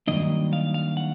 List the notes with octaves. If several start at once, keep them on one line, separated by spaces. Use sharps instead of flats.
G2 D#3 F#3 A#3 D4 D#5
F5
F5
F#5